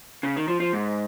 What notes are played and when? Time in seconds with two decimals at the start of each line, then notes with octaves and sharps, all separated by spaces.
0.23 C#3
0.36 D#3
0.48 F3
0.60 F3
0.73 G#2